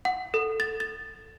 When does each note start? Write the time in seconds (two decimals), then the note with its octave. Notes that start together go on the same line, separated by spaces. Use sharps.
0.05 F#5
0.34 A4
0.60 A6
0.80 A6